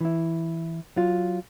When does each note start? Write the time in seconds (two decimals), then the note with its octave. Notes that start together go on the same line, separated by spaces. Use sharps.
0.01 E3 E4
0.96 F#3 F4